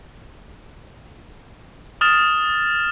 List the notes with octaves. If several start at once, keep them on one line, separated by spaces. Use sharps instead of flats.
D#6 F6 A6 E7